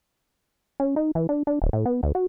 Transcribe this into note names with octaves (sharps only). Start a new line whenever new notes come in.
C#4
D#4
E3
D4
D4
D1
A2
B3
D2
F#4